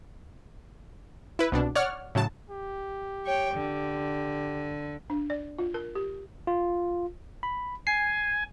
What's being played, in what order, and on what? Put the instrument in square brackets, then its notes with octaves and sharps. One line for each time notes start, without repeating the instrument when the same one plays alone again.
[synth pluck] E4 B4
C2 B2 D4
C#5 D5 F#5 F6
A2 C#3 F#3 A5
[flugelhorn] G4
[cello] C#5 G5
D3
[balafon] D4
D5
F4
A#4
G4
[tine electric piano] F4
B5
[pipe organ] G#5 [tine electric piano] C7